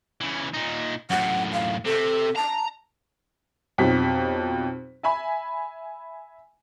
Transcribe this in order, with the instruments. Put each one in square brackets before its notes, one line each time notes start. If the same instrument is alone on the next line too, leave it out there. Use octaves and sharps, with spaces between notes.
[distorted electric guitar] C#3 E3
A#2 D#4
[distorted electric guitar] F#2 A2 [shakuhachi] F#5
[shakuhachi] F5
[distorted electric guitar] C3 [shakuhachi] A4
[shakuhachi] A5 [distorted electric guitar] A#5
[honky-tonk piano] F2 B2 F#3 D#4 G4 B6
E5 G#5 B5